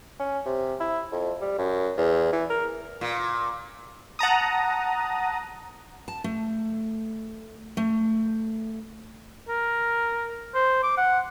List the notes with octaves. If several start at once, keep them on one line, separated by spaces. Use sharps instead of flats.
C#4
C3
E4
F2
G3
F#2
E2
E3
A#4
A#2
F#5 A5 A#5 D#6
A5
A3
A3
A#4
C5
D6
F#5